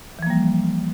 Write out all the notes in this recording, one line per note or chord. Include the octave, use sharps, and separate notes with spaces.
E3 F3 G3 A#3